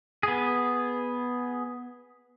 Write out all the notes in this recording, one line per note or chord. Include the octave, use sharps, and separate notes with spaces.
B3 G#4